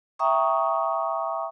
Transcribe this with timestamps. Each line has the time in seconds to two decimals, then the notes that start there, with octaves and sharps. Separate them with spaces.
0.19 E5 G5 A#5 C#6 D#6